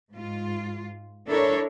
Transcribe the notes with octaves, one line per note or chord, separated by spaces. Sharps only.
G#2 F4
D4 E4 A4 A#4 C#5